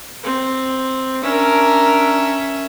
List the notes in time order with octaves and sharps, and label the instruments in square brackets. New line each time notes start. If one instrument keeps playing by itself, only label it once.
[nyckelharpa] C4
[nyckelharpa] C#4 E5 [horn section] D4 A#4